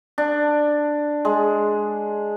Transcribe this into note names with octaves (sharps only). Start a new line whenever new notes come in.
D4
G#3